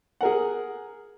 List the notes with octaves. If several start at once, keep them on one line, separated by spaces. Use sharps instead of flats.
G#4 A#4 F#5